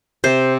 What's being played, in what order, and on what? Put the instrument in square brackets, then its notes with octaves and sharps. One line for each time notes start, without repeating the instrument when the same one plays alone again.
[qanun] C3 C5